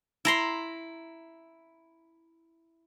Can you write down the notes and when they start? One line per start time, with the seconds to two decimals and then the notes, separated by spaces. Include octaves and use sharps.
0.25 E4 A#5 C6